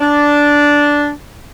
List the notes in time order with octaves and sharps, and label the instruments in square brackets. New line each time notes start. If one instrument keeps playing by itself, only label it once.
[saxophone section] D4